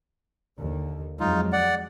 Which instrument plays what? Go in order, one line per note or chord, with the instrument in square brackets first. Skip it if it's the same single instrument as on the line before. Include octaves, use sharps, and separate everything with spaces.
[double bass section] D#2 D3
[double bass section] F2 F#3 G#3 [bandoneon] D#4 F4
[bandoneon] D5 F#5